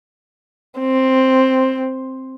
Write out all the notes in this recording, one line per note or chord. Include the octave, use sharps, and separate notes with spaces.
C4